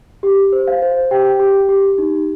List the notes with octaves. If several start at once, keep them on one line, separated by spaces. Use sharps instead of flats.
G4
C5
F5
C5
G4 G5
G4
G4
D#4